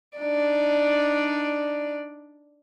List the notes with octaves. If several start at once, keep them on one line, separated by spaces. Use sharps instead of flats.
D4 D#4 D5